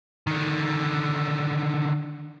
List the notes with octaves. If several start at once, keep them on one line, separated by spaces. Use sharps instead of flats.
D3 D#3